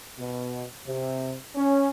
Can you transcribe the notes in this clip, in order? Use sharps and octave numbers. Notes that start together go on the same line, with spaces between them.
B2
C3
C#4